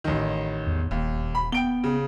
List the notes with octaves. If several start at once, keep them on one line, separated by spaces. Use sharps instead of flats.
A1 D#3
E2
D#1 D#2
B5
B3 G5 D7 G7
C#3